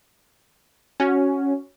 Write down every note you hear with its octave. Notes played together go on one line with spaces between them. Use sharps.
C#4 F#4